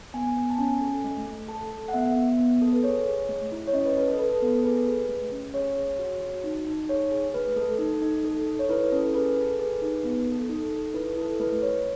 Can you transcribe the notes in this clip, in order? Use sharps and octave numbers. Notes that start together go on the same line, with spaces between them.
B3 G#5
B3
A5
C#4 G#5
A4
A3
A3
A4 A5
A4
F#5
B3 E5
B3
B3
A4
B4
G#4 C#5
G#4
A3
E4
C#5
C#4 D#5
B4
A4 B4
A4
A4 B4
A4
B3
A4
G#4 B4
G#4
A3
C#4
G#4 C#5
G#4
F#4
F#4
D#4
D#4
G#4 C#5
G#4
A3 B4
A3 A4
D#4
D#4
A4
A4
C#5
E4 B4
C#4 A4
G#4 B4
G#4 A4
G#4 B4
D#4
B3
A4
D#4 A4
A4
E4 B4
E4 A4
A3 B4
A3 C#5